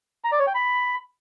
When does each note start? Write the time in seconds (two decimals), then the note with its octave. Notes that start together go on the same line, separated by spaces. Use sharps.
0.24 A#5
0.32 D5
0.40 C#5
0.47 G5
0.55 B5